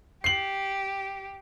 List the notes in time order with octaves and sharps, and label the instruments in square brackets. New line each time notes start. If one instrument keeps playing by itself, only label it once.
[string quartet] G4 [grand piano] C7 F#7